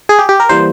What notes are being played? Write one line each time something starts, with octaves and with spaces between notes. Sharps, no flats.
G#4
G4
G4
A#4
E3 G3 A#3 C5